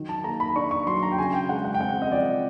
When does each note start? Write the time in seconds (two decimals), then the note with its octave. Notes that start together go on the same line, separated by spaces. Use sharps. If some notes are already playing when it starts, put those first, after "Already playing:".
Already playing: D#3 F#3
0.09 A5
0.24 A#3 A#5
0.40 B5
0.56 D4 C#6
0.71 C#6
0.87 F#3 C6
1.03 A#5
1.12 G5
1.18 C#3 G#5
1.34 G5
1.49 G#3 F#5
1.65 F#5
1.74 G5
1.81 C4 F#5
2.02 D#5
2.12 F3 D5